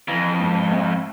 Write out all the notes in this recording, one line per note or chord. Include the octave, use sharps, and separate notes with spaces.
F2 E3
G#2
A3